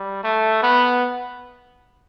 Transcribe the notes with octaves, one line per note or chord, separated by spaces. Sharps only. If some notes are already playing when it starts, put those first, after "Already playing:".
Already playing: G3
A3
B3